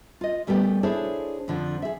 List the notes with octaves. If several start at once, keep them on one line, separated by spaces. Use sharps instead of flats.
F4 D#5
A#2 G3 A3 B3 G4
D4 E4 G#4 A4 C5 C#5
F2 D3 F3
G#4 E5